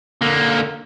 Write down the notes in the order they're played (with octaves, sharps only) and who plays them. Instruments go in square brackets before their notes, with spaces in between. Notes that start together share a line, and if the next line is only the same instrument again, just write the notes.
[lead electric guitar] D3 A#3